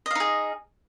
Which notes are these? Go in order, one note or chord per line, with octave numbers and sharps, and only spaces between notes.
D#4 G#4 D#5 F5